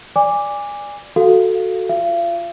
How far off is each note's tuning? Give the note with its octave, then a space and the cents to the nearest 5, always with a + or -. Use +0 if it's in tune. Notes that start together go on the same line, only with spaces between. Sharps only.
D5 +0 G#5 -20 D6 -5
F#4 +0 A4 +0 F5 +0
F4 -10 F5 -40